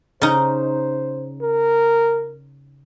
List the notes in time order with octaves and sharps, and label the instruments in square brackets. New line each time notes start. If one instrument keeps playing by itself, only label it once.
[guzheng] C#3 D#4 [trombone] C5
[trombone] A#4